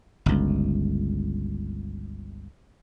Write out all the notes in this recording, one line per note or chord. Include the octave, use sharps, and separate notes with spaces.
G1 C#2